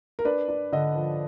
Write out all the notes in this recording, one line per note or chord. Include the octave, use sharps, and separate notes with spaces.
A#4
D4 B4
D4
D3 D#5
F3